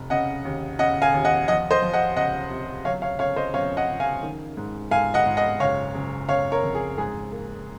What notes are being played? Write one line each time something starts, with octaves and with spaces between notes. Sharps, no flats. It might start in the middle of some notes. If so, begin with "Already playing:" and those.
Already playing: F1
C#3 D#5 F#5
D#2
C#3 D#5 F#5
F5 G#5
D#2
D#5 F#5
F3 D#5 F#5
C5 D#5
F3
D#5 F#5
C#2 D#5 F#5
C3
F#3 C#5 F5
C#5 F5
C#3 C#5 F5
C5 D#5
F#2 C#5 F5
D#5 F#5
C#3
F5 G#5
D#3
G#2
G#2 F5 G#5
D#5 F#5
G#2
D#5 F#5
F#1 C#5 F5
F#1
F#1 C#5 F5
A#4 C#5
F2
G#4
G#2 G#4
A#3